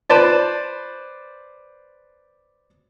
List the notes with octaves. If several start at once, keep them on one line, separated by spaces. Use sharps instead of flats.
B4 C5 D5 A5